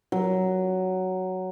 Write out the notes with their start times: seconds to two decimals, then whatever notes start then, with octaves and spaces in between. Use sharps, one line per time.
0.12 F#3